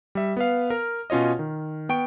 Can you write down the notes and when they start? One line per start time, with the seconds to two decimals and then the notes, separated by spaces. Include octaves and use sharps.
0.15 G3 E5
0.37 B3 B4 F5
0.70 A#4 F6
1.10 B2 C#4 F4 C#5 D#5
1.39 D#3
1.89 B3 G5 C#6 D7